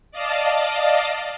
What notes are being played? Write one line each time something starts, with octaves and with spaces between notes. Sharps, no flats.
D5 D#5 F5 A5